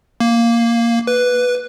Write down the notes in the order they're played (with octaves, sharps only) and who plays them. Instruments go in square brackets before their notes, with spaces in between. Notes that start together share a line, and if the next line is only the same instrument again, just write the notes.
[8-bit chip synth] A#3
B4